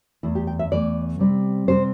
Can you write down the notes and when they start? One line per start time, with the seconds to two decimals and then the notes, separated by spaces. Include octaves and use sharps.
0.23 E2 E3 A3 E4
0.35 G4
0.47 G5
0.59 E5
0.71 E2 E3 A3 D5
1.19 C3 G3 C4
1.68 C3 G3 C4 C5